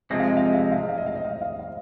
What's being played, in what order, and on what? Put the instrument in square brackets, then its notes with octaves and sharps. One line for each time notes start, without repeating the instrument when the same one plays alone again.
[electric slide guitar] C3 F3 G#3 C4 [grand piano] D#5
[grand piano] F5
D#5
F5
D#5
F5
D#5
F5
D#5
F5
D#5
F5
D#5
F5
D#5
F5
D#5
F5